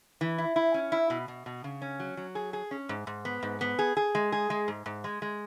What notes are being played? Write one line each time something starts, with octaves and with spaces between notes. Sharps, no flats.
E3
E4
E4
C#4
E4
B2
B2
B2
C#3
C#4
F#3
F#3
G#4
G#4
C#4
G#2
G#2
B3
G#2
B3
G#4
G#4
G#3
G#4
G#3
G#2
G#2
G#3
G#3